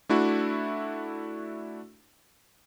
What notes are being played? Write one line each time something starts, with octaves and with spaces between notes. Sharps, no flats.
A3 D4 E4 F#4